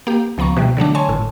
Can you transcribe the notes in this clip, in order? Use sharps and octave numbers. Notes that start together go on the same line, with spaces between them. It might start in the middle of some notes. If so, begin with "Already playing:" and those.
A#3 G4
C#2 F3 B3 A#5 C#6
B2 E3 G3
D3 F#3 A3 D4
C#5 G#5 A5 C6 C#6
G#1 A2